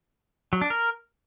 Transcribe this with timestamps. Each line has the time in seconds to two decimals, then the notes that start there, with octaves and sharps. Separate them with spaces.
0.53 F#3
0.61 D4
0.70 A#4